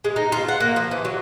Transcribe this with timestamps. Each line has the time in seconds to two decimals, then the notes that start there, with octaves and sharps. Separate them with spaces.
0.04 G#3
0.16 D#4
0.32 F4
0.48 F#5
0.60 A#3
0.76 F3
0.91 E3
1.05 F#3